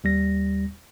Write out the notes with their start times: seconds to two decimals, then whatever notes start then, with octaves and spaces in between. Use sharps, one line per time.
0.04 D#2 G3 A#6